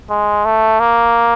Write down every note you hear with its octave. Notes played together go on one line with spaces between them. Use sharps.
G#3
A3
A#3